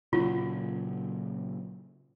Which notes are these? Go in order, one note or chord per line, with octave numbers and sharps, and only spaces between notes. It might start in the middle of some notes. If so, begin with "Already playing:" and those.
A#2 C#3 F#3 F4